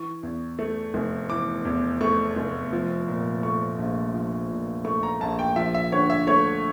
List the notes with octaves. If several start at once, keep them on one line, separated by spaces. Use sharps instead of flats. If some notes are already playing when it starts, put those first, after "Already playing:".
Already playing: E3 C#6
E2
A3
F1
E3 D6
E2
A3 C#6
F1
F3
A#2
A3 C#6
A#1
F3
A#2
A3 C#6
A#5
A#1 A5
G5
F3 E5
E5
D3 C#5
E5
A3 C#5